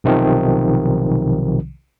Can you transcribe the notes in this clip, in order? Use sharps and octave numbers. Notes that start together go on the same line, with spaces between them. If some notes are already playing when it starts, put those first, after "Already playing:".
B1 C3 D#3 F3